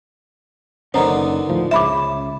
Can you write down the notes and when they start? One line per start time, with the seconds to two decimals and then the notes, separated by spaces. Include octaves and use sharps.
0.94 F#1 D3 D#3 B3 C#4 C5 A#5
1.49 D2 A2 F3
1.71 C#2 C#3 E5 A5 B5 D6